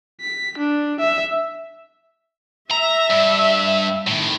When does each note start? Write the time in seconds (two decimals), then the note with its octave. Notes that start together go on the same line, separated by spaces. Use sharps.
0.21 B6
0.57 D4
1.00 E5
2.71 E5 A#5
3.10 G2
4.07 A2 D#3